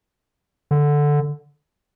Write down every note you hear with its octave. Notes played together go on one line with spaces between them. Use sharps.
D3